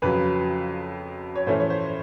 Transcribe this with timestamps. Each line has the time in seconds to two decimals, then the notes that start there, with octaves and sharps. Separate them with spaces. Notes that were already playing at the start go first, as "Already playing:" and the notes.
0.02 F2 C#3 F#3 B4
1.36 C#5
1.47 A2 E3 A3 C#4 E4 C5
1.60 C#5
1.70 C5